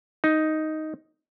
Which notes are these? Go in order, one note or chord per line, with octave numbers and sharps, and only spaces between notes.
D#4